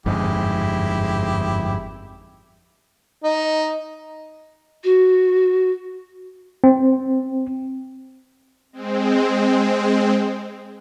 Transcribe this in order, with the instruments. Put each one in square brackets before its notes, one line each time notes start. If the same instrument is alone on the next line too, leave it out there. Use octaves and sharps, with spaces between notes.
[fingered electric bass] G1 F2 G#2 [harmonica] G#3 E4 G4
[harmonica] D#4
[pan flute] F#4
[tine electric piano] C4
[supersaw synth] G#3 C4